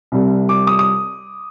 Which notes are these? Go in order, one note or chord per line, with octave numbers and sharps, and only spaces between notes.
C2 C3 G3
D6
D#6
D#6